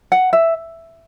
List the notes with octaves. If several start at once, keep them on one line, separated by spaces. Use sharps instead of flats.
F#5
E5